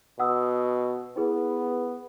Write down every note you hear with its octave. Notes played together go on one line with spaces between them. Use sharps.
B2 F#5 D#6 E6
B3 E4 G#4 B4